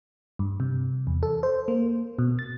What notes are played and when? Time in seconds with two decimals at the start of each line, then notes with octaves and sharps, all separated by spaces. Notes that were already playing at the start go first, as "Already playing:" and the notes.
0.39 G2
0.60 C3
1.07 E2
1.23 A4
1.43 C5
1.68 A#3
2.19 B2
2.39 A6